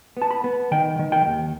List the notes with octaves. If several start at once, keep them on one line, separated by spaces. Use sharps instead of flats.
B3 A5
B5
B3
D#3 G5
D#3
G5
D#2